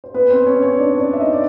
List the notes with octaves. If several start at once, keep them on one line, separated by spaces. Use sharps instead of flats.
C5
B3 B4
C4 C5
C#4 C#5
C#4 C#5
D4 D5
C#5
D4 D5
E5
D#4 D#5
D5